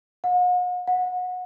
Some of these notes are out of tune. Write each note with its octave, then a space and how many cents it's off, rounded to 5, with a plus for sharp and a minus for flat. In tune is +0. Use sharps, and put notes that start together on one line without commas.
F#5 -45
F#5 -25